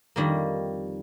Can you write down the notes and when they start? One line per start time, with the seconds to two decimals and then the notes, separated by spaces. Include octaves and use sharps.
0.16 F2 D#3 G3 A#3